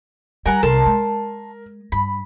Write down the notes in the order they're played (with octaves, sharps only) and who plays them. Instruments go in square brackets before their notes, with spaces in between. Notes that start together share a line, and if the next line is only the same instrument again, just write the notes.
[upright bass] G3 [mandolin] A#4 F#5 A#5 [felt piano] G#5
[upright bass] C2 [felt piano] A#4 [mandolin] A5 C6
[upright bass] G#3
[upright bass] G2 [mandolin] B5